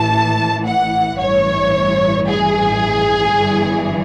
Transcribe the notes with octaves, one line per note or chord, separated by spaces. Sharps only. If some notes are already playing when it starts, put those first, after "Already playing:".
Already playing: A1 A2 E3 A5
F#5
A1 G2 E3 C#5
G#4
G1 G2 E3